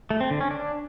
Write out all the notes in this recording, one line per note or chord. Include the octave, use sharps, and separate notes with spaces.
A3
C4
D3
C#4
D4